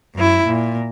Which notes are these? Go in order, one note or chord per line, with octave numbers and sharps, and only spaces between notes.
F#2 E4
A#2